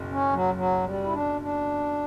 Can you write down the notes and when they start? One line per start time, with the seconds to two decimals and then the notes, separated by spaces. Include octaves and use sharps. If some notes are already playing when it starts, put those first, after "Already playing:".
Already playing: F#1 B2
0.11 C#4
0.33 F#3
0.54 F#3
0.84 G3
1.04 E4
1.12 D4
1.41 D4